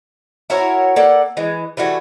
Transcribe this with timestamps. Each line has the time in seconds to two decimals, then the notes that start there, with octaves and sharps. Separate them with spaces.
0.50 E4 F#4 A#4 C#5
0.96 A#3 A4 D5 F#5
1.37 E3 G#3
1.77 E3 G3 A3 F#4